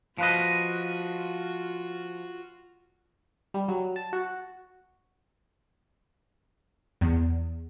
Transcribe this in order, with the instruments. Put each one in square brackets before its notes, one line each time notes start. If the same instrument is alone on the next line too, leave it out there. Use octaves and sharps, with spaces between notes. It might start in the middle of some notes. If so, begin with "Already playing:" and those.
[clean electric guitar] F3 B4 D#5 [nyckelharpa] F4 F#4
[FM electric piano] G3
F#3
A5
F#4
[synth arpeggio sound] E2